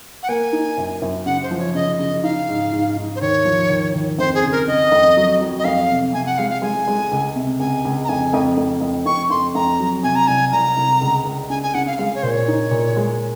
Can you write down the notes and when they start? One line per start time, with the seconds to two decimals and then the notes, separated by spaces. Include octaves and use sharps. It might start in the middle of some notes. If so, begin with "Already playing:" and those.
0.23 F#5
0.29 A#3 G#5
0.53 D#4
0.78 F#2
1.02 F#2
1.26 C#3 F#5
1.43 C5
1.51 F3
1.59 C#5
1.74 C#3 D#5
1.99 C#3 D#5
2.23 D#4 F5
2.48 G#2
2.72 G#2
2.97 G#2
3.16 C5
3.21 D#2 C#5
3.45 F3
3.69 D#2
3.94 D#2
4.18 F2 C5
4.35 G#4
4.43 C#3
4.52 A#4
4.67 C#3 D#5
4.92 F2
5.17 F#3
5.41 F#3
5.59 D#5
5.65 F2 F5
5.90 C3
6.13 C3 G#5
6.26 F#5
6.38 G#3 F5
6.50 F5
6.62 G#3 G#5
6.87 G#3
7.11 C#2
7.35 C3
7.59 C#2 G#5
7.85 C#2
8.03 A#5
8.09 F2 G#5
8.33 F2
8.57 F2
8.81 F2
9.06 F2 C#6
9.30 F2 C6
9.55 F2 A#5
9.80 F#3
10.03 C3 G#5
10.16 A#5
10.28 C2 G#5
10.52 C2 A#5
10.77 C2
11.01 C#2
11.25 C#2
11.50 C#3 G#5
11.63 G#5
11.74 C#3 F#5
11.87 F5
11.99 G#3 F5
12.15 C#5
12.23 A#2 C5
12.31 C#5
12.48 D#4
12.71 A#2
12.96 G#3